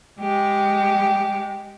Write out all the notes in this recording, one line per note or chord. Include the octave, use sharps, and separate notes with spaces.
G#3 G4